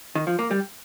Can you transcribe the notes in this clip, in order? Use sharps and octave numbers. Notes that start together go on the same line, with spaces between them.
D#3
F3
A#3
G3